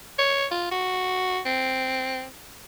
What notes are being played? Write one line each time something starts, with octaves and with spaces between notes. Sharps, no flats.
C#5
F4
F#4
C4